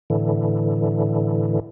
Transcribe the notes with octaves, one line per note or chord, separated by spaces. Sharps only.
A2 D3 E3